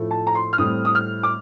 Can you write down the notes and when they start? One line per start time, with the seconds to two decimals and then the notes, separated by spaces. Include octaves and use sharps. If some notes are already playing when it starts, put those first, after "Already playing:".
Already playing: A2 F3 A3
0.11 A5
0.27 A#5
0.35 C6
0.53 F6
0.58 A2 G3 C4 D#6
0.85 D#6
0.95 F6
1.23 D6